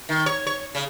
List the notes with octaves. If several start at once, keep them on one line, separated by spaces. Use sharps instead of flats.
D#3
C#5
C#5
C#3